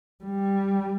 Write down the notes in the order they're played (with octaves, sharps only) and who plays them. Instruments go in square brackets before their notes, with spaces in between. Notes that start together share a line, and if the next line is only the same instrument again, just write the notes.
[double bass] G3